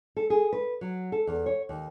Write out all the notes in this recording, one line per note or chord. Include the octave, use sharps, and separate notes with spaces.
A4
G#4
B4
F#3
A4
E2
C#5
D#2